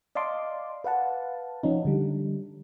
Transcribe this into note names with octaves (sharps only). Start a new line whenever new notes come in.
D5 D#5 F5 A5 C6 D6
B4 F5 F#5 A5
F3 C#4 D#4
D3 G3